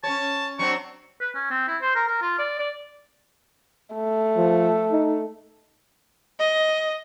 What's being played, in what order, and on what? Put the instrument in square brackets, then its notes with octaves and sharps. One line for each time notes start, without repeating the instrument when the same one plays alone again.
[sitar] C#4 C#5 [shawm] A5
[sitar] F#3 C4 D4 [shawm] C#6
[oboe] B4
C#4
C4
E4
C5
A#4
A#4
F4
D5
D5
[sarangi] A3
[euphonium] F3
D#4
[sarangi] D#5